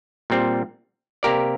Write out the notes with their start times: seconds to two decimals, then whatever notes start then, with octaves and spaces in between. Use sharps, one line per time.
0.30 A#2 G3 C4
1.23 C3 A#3 G4 A#4 D5